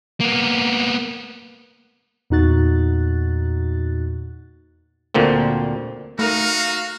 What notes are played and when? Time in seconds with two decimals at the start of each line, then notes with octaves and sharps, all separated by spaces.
0.20 A#3 B3
2.30 E2 A#2 D#4 F#4 F#6 A6
5.15 D2 A#2 D3 A#3 C4
6.19 A3 D#4 F#4 A#4 F5